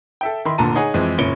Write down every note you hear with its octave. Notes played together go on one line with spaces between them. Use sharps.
A4 E5 G5
D#3 E4 B5 C6
F1 A#2 D3 A5 A#5 D#7
D#4 G#4 C#5 F#5 G#5
F2 E3 G#3 C4
F#1 A#2 C#4 C#7 D7 G7